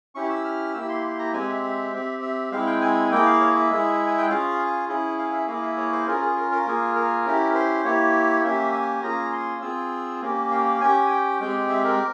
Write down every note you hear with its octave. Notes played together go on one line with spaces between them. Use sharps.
C#4 E4 G4 C#6
E6
F6
A#3 E4 G4 E6
C6
C6
A#5
G#3 C4 G4 G#5
E5
E5
C4 G4
E5
G#3 C4 E4 F5
G5
G#5
A#3 E4 G#4 G5
F5
C#5
E5
G#3 E4 G#4
G#5
G5
C#4 F4 G#4 F5
F5
C#4 E4 G#4
F5
E5
A#3 E4 G#4 F5
E5
C#5
C5
C#4 F4 G#4 A#4
G#4
A#4
A#4
A#3 F4 G#4
A#4
C#4 E4 G4
C5
A#3 E4 G4 C#5
A#3 C#4 G4 E5
G#5
A#3 C#4 F4 G#4 A#5
C6
C4 F4 G#4 E6
A#3 C#4 G4
F5
C#4 G4 G#5
G5
G#3 C4 G4 G5
E5
A#4